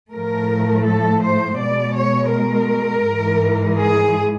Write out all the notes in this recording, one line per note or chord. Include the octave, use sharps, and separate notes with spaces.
A2 F3 A3 A#4
A4
C5
B2 G#3 D5
C#5
A#4
G#2 E3 G#3
G#4